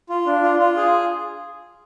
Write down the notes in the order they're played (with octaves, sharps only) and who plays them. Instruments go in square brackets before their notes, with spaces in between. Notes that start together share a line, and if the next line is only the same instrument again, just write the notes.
[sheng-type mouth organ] F4
D4
F4
F4
G#4